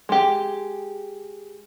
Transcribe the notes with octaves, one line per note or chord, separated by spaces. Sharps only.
G#3 G4